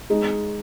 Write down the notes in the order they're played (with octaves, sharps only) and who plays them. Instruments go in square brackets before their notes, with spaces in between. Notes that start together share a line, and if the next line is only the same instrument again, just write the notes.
[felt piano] G#3 D#4 G#4